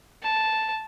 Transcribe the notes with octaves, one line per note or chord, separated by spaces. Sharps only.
A5